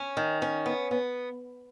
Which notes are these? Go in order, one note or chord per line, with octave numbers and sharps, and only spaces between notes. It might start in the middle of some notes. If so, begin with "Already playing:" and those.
Already playing: C#4
D#3
C#4
B3
B3